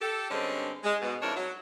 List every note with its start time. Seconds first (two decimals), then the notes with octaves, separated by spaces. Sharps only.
0.01 G4 A4
0.30 G2 D3 G#3 C4 C#4
0.84 G#3
1.01 G#2 B2
1.22 F2 G#2 D4 E4 A#4 C#5
1.36 F#3